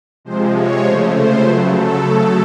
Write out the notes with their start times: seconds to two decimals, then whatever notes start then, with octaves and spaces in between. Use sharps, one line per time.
0.25 C3 F3 G#3 C5
0.54 C#5
0.83 C#3 F3 A3 C5
1.13 C5
1.41 C#3 F#3 A3 B4
1.71 A4